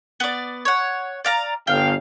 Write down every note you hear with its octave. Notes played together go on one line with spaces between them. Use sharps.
B3 D5
C#5 F#5
D5 F5 A#5
G1 F5 G5